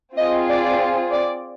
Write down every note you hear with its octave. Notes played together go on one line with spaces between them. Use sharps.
C4 F4 G#4 D#5
D5
D5